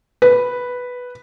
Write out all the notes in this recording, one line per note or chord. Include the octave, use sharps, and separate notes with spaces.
B4